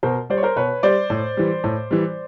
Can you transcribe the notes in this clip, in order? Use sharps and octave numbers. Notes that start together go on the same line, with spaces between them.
B2 A#4 C5
G3 C5 D5
C#5
A#4 C5
B2 B4 C#5
G3 C5 D5
A2
E3 G3
A2
E3 G3